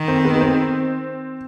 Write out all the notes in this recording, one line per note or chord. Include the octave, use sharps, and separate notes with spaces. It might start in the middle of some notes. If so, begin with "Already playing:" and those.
Already playing: D#3
C4
B3
B3
C4